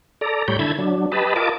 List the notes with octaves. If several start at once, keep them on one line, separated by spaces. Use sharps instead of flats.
A4 D5 A#5
A2 G3 C#5 B5 G6
D3 E4 A5 B5 G#6
F#3 D4
G4 B4 D#5 A5 B5
F4 A#4 D#5 A5 D6